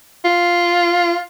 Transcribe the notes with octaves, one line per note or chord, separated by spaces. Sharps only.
F4